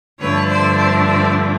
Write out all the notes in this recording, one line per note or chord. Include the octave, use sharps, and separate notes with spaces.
G2 D3 F3 A3 B4 C#5
C5 D5
C5 D5
C5 D5